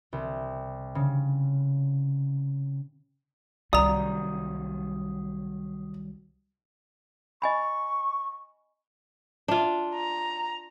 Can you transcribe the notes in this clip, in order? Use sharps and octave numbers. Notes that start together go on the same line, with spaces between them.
C2
C#3
C2 D#3 F#3 G3 D5 A#5 D#6
D#5 G#5 B5 C#6
D4 F4
A#5